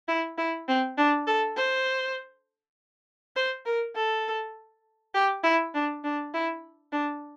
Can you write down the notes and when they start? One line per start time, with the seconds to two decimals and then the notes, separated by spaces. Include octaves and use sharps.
0.08 E4
0.38 E4
0.68 C4
0.97 D4
1.27 A4
1.57 C5
3.36 C5
3.66 A#4
3.95 A4
5.14 G4
5.43 E4
5.74 D4
6.04 D4
6.34 E4
6.92 D4